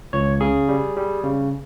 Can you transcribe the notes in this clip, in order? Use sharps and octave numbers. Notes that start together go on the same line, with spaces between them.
C#2 C#5
C#3 G#4
G3
G3
C#3